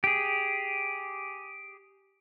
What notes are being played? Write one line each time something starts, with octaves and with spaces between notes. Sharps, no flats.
G4 G#4